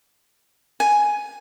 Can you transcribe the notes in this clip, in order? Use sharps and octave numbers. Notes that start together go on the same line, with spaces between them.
G#5